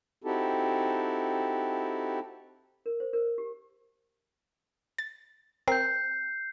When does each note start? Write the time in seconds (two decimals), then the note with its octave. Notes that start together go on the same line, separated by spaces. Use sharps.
0.24 C4 D#4 E4 F#4 G4 A4
2.86 A#4
3.00 C5
3.13 A#4
3.38 G4
4.98 A6
5.68 C4 A#4 G6 C7